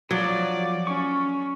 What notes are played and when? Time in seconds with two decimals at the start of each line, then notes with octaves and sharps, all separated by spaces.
0.11 F3 F#3 D5
0.87 C#4 C#6